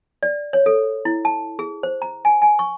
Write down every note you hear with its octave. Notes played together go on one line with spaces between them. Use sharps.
D5
C#5
A4
E4
A5
G#4
C5
A#5
G#5
G#5
C#6